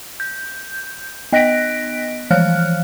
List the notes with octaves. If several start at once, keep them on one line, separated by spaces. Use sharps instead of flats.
G6
B3 D#5 F#6 A#6 B6 D7
E3 F3 F5 F6 F#6